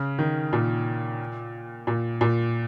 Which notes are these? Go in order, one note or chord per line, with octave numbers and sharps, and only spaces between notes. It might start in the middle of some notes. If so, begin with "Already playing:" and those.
Already playing: C#3
D#3
A#2
A#2
A#2